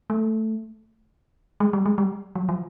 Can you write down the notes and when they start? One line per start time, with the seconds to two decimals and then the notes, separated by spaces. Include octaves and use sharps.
0.10 A3
1.60 G#3
1.73 G3
1.86 G#3
1.98 G3
2.35 F#3
2.49 F3